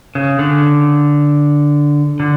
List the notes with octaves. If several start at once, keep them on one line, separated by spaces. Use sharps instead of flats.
C#3
D3
D3